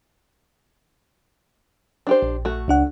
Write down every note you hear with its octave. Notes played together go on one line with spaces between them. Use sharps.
D4 G4 C5
A#1
A3 F#4
C#2 D4 F#5